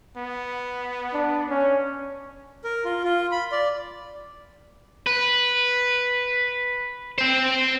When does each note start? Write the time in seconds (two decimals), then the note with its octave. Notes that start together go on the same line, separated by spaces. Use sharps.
0.17 B3
1.13 D4
1.49 C#4
2.63 A#4
2.85 F4
3.04 F4
3.31 B5
3.52 D5
5.07 B4
7.18 C4 C5